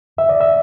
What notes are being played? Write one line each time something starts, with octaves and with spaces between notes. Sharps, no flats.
E5
D5
E5